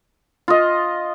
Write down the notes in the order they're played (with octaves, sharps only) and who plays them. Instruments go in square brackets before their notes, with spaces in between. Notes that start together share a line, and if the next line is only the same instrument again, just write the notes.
[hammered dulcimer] F4 D#5